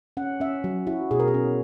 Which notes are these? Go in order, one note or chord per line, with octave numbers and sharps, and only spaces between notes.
C#4 F#5
C#4 E5
F#3
E4 F#4
B2 G#4
A#4
G#4
C#4